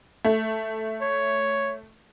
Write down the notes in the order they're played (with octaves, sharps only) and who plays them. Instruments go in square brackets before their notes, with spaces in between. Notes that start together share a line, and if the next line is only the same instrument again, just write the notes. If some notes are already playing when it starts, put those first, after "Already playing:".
[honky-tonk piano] A3
[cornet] C#5